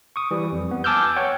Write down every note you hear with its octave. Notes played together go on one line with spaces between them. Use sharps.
C#6 D#6
E3 G3
F2
B3
G#5 A5 D6 E6 F6 G6
C#5 F#5 G5